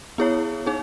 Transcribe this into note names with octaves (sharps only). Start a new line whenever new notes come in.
B3 E4 G#4 C#5
D#4 G#4